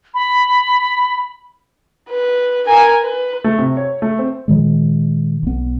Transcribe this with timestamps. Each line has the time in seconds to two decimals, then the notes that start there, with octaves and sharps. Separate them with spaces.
0.14 B5
2.10 B4
2.67 A#4 G#5
3.02 B4
3.44 A3
3.58 C3
3.77 C#5
4.02 A3
4.19 C4
4.48 A#2 D#3 F3 G#3
5.43 B1 B3